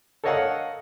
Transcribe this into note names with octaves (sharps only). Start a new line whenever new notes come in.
A4 A#4 C#5 D#5 F5 F#5